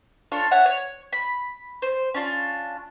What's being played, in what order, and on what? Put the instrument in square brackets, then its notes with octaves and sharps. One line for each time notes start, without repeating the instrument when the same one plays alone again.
[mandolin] D4 F4 A4 C#5
C#5 E5 F#5 F#6
C#5
B5
C5
C#4 D4 F4